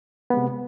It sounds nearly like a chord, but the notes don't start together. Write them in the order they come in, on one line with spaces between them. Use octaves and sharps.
B3 G#3 C3